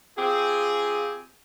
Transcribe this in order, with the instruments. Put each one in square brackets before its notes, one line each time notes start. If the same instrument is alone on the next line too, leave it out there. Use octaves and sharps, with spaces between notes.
[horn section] C4 F4 G4 G#4